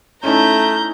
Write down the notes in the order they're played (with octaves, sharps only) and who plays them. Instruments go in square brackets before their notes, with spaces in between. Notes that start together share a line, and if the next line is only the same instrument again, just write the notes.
[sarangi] A3 [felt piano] C#4 D#4 E4 [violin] A#5 G6